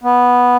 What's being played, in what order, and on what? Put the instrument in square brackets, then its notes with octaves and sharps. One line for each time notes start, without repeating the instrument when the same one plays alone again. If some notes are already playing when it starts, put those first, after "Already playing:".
[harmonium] B3